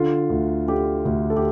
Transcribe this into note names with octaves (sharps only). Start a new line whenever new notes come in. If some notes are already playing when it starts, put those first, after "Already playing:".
Already playing: D3 F4
D2
D3 G4
D2
A4
G4